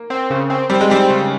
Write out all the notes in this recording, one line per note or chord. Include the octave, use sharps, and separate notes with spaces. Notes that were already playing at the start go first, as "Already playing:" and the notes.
Already playing: A#3
C4
C#3
C4
G3 C4
G#3
G3 C4
C#3